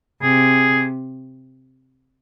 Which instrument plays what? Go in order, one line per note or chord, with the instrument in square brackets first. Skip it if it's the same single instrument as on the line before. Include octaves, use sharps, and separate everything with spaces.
[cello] C3 [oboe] G#4